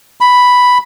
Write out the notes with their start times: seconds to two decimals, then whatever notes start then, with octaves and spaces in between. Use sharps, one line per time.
0.21 B5